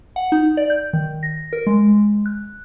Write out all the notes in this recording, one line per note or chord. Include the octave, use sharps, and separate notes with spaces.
F#5
D#4
D5
G6
D#3
A#6
A#4
G#3
F#6